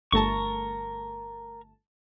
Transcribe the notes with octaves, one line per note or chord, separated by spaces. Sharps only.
G1 A3 A#4 A5 C#6